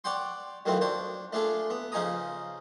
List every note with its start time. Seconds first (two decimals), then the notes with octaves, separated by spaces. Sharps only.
0.04 C#5 D5 F#5 G5 C6
0.66 F#2 D#3 E3 A3 C4 F4
0.81 D4 C5 C#5
1.33 A3 D4 F4 G#4 A4
1.70 B3
1.92 C#3 F3 D#4 G#5 A#5 D#6